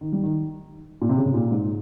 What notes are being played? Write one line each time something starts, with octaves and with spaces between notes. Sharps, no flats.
D#3
G3
D#3
A#2
C3
C#3
C3
A#2
G#2